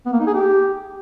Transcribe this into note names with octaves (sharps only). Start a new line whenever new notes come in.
B3
A#3
D#4
G#4
G4